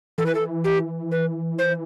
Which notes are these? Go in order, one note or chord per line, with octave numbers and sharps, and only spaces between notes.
E3 A4
B4
A4
G4
B4
C5